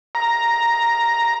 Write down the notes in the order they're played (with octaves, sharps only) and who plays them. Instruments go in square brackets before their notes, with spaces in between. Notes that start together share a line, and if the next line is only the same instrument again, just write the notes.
[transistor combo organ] A#5